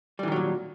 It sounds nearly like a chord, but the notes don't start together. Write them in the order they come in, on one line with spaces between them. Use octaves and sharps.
G3 E3 D#3 F#3 A#2